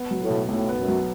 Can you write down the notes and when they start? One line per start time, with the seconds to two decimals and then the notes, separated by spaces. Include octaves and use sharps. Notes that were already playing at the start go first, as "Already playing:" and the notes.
Already playing: B3
0.11 F#3
0.21 A2
0.30 B2
0.48 B1 A2
0.69 B3
0.78 F#2
0.88 F#3